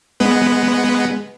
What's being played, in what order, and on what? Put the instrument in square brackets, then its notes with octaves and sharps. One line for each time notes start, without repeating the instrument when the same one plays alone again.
[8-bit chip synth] G#3 B3 B4